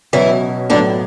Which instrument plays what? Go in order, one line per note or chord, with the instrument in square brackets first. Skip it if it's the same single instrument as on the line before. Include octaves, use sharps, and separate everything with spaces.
[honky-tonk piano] B2 F#3 C#4 [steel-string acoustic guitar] E3 E4
[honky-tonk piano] A2 F#3 B3 [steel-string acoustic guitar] D3 D4